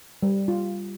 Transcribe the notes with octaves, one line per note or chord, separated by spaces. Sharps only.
G3
F4